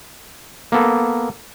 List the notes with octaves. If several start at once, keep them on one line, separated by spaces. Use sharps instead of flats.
A#3 B3 A4